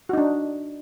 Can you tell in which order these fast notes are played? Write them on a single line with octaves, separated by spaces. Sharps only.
F#4 D#4 D4